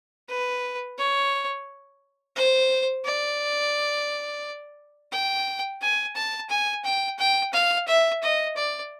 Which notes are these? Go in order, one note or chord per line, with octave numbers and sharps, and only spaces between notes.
B4
C#5
C5
D5
G5
G#5
A5
G#5
G5
G5
F5
E5
D#5
D5